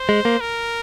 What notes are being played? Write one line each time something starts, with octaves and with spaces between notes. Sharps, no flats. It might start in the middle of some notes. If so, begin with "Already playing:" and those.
Already playing: C5
G#3
A#3
A#4